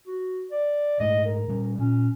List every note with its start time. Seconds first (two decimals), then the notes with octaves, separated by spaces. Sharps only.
0.07 F#4
0.51 D5
1.00 G#2 G#3 A3 D#5
1.25 A#4
1.48 A#2 G3
1.79 A#2 C#4